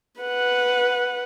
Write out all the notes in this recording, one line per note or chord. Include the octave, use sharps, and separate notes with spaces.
B4 F#5